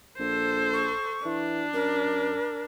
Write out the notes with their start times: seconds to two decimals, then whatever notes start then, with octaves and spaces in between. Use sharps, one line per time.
0.19 A#1 A4 C5
0.73 C#6
1.25 E3 D4
1.74 F#2 A#4